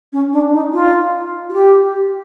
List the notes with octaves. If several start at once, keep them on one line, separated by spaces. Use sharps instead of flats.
C#4
D4
D#4
F4
F#4
G4